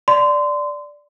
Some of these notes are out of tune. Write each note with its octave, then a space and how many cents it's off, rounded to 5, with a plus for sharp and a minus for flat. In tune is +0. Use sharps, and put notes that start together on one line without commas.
D5 +0 C6 -25